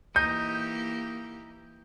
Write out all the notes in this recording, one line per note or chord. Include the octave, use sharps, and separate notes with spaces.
E3 A#3 D#4 G4 G6